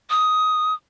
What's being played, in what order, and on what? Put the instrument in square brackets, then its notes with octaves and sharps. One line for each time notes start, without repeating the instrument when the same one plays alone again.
[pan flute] D#6